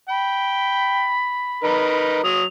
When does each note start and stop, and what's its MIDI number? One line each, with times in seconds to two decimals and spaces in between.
0.09 1.14 79
0.09 2.03 83
1.64 2.20 63
1.64 2.20 70
1.64 2.20 71
2.24 2.43 54
2.24 2.43 87
2.24 2.46 101